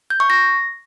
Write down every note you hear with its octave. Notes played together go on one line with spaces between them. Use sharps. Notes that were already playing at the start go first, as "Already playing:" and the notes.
G6
C#6
A#6